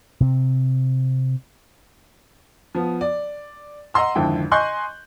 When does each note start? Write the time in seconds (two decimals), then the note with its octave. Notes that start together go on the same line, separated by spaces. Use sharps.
0.20 C3 C4
2.75 F3 B3
3.01 D5
3.94 D#5 F#5 A#5 C6 E6
4.15 G#1 F2 D3 E4 G5
4.51 D#5 G#5 C6 C#6 F#6 G6